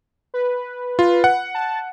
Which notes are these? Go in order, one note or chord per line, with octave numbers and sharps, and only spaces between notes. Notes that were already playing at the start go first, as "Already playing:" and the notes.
B4
F4
F#5
A5